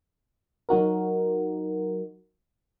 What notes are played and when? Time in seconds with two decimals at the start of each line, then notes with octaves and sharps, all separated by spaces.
0.69 F#3 D#4 F#4 A#4